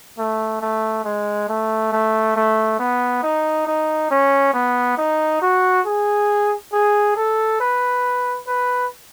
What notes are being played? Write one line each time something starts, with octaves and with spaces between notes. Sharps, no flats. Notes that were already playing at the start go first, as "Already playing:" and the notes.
A3
A3
G#3
A3
A3
A3
B3
D#4
D#4
C#4
B3
D#4
F#4
G#4
G#4
A4
B4
B4